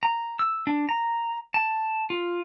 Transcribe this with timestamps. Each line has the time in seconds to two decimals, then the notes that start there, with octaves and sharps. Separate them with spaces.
0.03 A#5
0.39 E6
0.67 D4
0.89 A#5
1.54 A5
2.10 F4